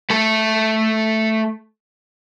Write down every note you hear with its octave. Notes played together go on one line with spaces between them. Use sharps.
A3 A4